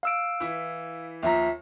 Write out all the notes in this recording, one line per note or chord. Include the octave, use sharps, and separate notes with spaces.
F5 E6 D7
E3 E4
D#2 F3 E5 A#5